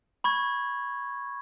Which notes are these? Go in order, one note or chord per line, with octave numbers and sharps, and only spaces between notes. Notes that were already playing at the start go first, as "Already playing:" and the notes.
B5 C#6 G#6